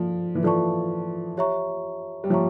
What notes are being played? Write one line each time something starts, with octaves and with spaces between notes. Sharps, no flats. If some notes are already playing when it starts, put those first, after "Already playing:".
Already playing: F3 A4 D5
E3
F3 A4 D5 A5 C#6
G4 C#5 E5 A#5 C#6
G3
F3 G4 C#5 E5 A#5 C#6